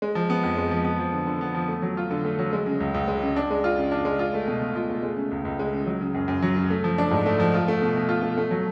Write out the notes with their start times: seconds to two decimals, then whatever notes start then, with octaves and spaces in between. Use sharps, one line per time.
0.02 G#3
0.15 F3
0.30 B3
0.44 F2
0.57 G#3
0.71 F3
0.85 B3
0.99 F3
1.13 D3
1.27 D3
1.41 B3
1.54 F3
1.68 A3
1.82 F#3
1.97 F4
2.11 D3
2.25 A3
2.39 F#3
2.53 G#3
2.66 C#3
2.80 C#2
2.94 C#2
3.08 G#3
3.22 C#3
3.36 D4
3.50 G#3
3.64 F4
3.78 C#3
3.92 D4
4.05 G#3
4.19 F4
4.34 A3
4.47 B2
4.62 B2
4.76 F4
4.90 A3
5.03 G#3
5.16 C#3
5.31 C#2
5.45 C#2
5.59 G#3
5.73 C#3
5.86 F#3
6.01 C#3
6.14 F#2
6.28 F#2
6.42 F#3
6.56 C#3
6.70 A3
6.84 F3
6.98 D4
7.11 G#2
7.26 A3
7.40 F3
7.54 F4
7.68 A3
7.82 B2
7.96 B2
8.09 F4
8.23 A3
8.37 A3
8.51 F#3